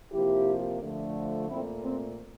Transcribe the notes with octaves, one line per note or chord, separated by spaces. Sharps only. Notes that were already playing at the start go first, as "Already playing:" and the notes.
C3 F3 A#3 E4 G4
D3 F3 A3
A#2 A3 C4 E4
C4